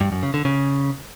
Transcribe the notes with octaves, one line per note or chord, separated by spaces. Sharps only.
G2
F#2
C#3
D3
C#3